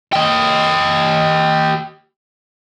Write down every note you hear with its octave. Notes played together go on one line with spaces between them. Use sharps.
G4 D#5